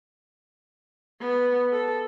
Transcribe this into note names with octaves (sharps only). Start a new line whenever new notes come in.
B3
A4